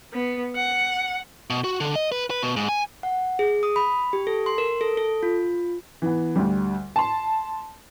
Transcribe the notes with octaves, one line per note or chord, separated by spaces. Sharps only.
B3
F#5
B2
F#4
D3
D#5
B4
B4
B2
G#2
G#5
F#5
G#4
D#6
B5
G4
A4
C6
A#4
A4
A4
F4
E3 B3
D2 G3
A5 C6